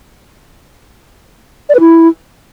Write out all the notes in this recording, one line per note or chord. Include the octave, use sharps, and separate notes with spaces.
D5
B4
E4